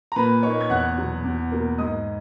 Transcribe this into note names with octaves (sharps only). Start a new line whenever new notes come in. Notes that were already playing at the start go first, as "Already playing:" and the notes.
A#5
A#2 B4 B5
A#3 D#4 C#5 C#6
G#6
E2 F#5 F#6
B2 F#3
E2
B2 A#3
G#2 D#5 D#6